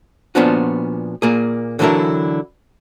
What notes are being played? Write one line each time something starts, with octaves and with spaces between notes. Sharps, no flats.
A#2 F3 B3 C#4 D4 F#4
A#2 A#3 G#4
D3 E3 F#3 D4 E4 A#4